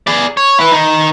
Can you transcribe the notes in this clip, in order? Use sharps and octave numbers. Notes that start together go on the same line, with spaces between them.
G#4 D5
C#5
E4 B4
D#3 D#4